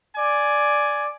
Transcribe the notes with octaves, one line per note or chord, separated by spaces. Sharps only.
D5 G#5